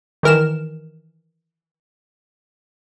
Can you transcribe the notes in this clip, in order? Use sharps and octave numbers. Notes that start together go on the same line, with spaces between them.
D#3 E3 A#4 F6 E7